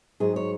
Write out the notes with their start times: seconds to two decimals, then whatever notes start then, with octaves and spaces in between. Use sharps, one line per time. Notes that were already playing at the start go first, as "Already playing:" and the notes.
0.20 G#2 F#3 G#4
0.36 C#5